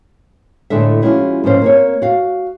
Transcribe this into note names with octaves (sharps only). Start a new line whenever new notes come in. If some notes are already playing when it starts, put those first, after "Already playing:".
A2 D3 G#3 D4 A4 E5
F3 G#3 A#3 C#4 E4 F#4
G#2 F3 A#3 C#4 C5
A#3 C4 C#5
F#4 F5